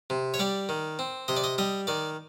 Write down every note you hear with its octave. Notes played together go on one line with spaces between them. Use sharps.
C3
C#5
G3 D5
D#3
C4
C3 D#5
D5
D#5
G3 D#5
D#3 D5